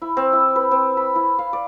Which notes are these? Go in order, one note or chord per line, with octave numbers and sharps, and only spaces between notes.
E4
C4
E4
B4
C4
B5
E4
F5
D5